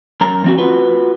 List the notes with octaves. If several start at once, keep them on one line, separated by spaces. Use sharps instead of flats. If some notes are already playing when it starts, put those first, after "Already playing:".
F#2 A#4 A#5
F3 C4 F#4
F4 F#4 B4